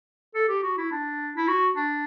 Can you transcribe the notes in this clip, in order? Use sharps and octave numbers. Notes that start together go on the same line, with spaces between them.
A4
G4
F#4
E4
D4
E4
F#4
D4